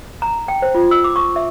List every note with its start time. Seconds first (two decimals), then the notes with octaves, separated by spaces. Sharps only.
0.22 A#5
0.48 G5
0.62 C5
0.75 F4
0.91 E6
1.04 D6
1.16 C#6
1.36 E5